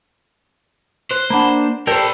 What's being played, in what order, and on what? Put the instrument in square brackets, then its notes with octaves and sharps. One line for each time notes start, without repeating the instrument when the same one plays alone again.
[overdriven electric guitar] C5 [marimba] F#6
[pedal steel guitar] A#3 D4 [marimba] F#5 A5 B5
[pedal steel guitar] G4 A4 G5 [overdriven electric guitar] A#4 C5 [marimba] D5